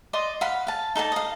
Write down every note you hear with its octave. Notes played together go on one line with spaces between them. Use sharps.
D5 D#5 C6
F5 F#5 B5
F5 A5
D#4 A4 D5 A5
D#5 F5